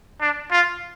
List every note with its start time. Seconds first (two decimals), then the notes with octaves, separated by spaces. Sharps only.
0.21 D4
0.52 F4